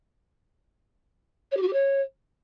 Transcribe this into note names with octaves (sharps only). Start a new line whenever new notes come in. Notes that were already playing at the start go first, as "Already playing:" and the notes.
C#5
G4
F#4
G4
C#5